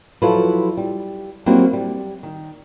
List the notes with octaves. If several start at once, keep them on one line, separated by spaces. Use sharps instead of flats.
F3 F#3 E4 F4 A4 B4
G3
F#3 G3 A#3 C4 E4 G4
G3
D#3